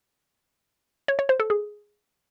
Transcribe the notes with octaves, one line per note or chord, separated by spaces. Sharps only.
C#5
C#5
C5
A4
G#4